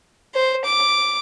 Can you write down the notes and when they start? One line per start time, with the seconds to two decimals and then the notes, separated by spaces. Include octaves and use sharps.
0.35 C5
0.65 D6